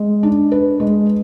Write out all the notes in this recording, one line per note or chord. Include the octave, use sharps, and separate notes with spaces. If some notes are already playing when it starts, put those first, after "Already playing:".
Already playing: G#3
D4
B4
G#3